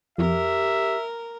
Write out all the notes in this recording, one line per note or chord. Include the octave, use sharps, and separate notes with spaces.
F2 G4 A#4 E5